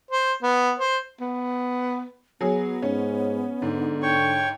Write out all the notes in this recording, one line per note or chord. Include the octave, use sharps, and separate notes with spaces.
C5
B3
C5
B3
F#3 B3 G#4
G#2 C#4
G#2 D3
C#5 G5 C#6